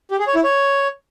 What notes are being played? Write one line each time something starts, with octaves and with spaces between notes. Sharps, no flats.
G4
G#4
C#5
E4
C#5